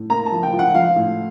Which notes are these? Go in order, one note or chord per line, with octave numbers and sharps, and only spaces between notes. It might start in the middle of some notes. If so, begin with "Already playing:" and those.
Already playing: A2
A#3 A#5
A5
F3
G5
F3
F#5
F3 F5
A2